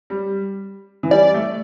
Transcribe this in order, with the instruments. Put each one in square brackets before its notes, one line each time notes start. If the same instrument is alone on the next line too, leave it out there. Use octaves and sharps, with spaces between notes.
[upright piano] G3
E3
[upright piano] G3 [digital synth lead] D5
[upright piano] A3